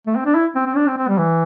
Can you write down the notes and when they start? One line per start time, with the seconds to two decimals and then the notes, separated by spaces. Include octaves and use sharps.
0.07 A3
0.16 C4
0.25 D4
0.35 E4
0.56 C4
0.66 C4
0.76 D4
0.87 C4
0.98 C4
1.08 G3
1.18 E3